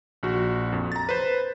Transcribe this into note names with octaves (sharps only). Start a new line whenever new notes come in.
A#1 F#4
F2
A#5 A6
B4 C5